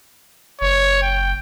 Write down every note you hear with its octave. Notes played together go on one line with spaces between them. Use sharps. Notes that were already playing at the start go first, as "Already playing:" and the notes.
F#1 C#5
G5